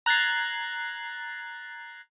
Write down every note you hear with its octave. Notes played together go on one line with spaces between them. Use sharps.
A#5 F#6 G#6 A6 C7